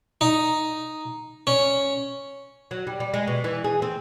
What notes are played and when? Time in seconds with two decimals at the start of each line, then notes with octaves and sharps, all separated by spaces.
0.21 D#4
1.47 C#4
2.71 F#3
2.87 G3
3.00 G3
3.14 G#3
3.27 B2
3.44 E3
3.64 G#4
3.82 C4